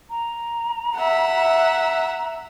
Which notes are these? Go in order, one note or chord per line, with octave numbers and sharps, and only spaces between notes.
A#5
E5 F#5